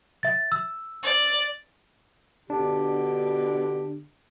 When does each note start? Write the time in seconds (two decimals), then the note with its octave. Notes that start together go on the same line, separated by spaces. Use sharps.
0.23 E5 A6
0.52 E6
1.03 D5
2.50 B2 D3 D4 G4